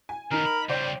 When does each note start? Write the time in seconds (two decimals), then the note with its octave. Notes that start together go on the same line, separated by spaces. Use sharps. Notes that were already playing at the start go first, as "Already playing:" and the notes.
0.09 G#5
0.32 D#3 B3 D#4 A#4
0.46 B5
0.70 C#3 G3 C5 D5 G5